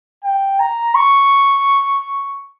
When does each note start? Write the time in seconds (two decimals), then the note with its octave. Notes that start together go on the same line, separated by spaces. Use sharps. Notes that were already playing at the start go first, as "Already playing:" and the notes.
0.24 G5
0.60 A#5
0.95 C#6